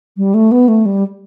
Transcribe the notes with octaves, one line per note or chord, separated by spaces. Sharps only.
G3
A3
B3
A3
G3